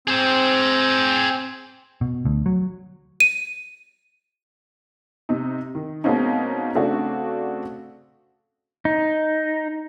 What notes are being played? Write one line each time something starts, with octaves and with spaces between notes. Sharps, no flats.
C4 G#4 C5
B2
D2
F#3
D#7
C3 D#4
D#3
B2 G#3 A#3 C4 C#4 D#4
C#3 A3 C4 D4 F#4
D#4